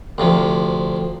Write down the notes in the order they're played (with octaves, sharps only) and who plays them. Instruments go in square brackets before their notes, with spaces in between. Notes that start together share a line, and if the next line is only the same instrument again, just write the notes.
[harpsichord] D2 C3 F3